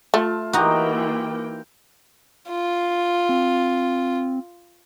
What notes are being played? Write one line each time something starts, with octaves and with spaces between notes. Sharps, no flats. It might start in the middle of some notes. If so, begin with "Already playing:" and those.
A3 F4 A5
E3 A#3 D#4 F#4 G4 G5 A#5
F4
C4